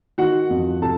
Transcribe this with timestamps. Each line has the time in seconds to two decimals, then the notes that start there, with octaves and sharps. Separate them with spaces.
0.18 D#3 F#4 F#5
0.50 F2
0.82 C3 A4 A5